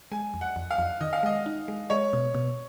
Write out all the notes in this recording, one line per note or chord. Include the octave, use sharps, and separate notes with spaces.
G#3 G#5
F2
F#5
F2
F5
F2
D#3 D#5
F5
G#3 D#5
D#4
G#3
G#3 C#5
B2
B2